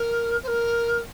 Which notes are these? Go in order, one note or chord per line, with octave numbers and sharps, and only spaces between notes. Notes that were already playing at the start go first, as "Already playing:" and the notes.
Already playing: A#4
C5
A#4